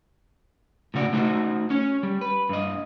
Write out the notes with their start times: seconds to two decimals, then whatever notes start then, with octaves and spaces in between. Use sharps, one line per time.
0.94 A2 C#3 F#4 B4 D5
1.13 A3 D#4 F#4 G#4 C5 D#5
1.70 C#4 C#5
2.03 G3
2.21 B4
2.49 G2 D#5